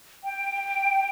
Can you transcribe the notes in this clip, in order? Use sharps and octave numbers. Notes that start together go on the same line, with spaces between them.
G5